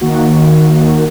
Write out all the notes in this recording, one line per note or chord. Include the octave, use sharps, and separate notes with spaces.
D#3 A#3 F#4